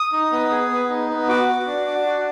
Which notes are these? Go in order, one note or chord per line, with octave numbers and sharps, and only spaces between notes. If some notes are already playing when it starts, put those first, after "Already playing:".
Already playing: D#6
D#4
B3
G#4
B3
D#4
B3
F#4 D6
F#4
D4
D4
F#4